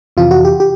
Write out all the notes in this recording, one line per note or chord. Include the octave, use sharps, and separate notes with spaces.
F2 C3 E3 F4
F#4
G4
G4